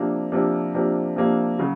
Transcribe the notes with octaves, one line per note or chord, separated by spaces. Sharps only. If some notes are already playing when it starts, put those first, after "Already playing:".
Already playing: C3 F3 A#3 D4
C3 F3 A#3 D4
C3 F3 A#3 D4
C3 F3 A#3 D4
C#3 F#3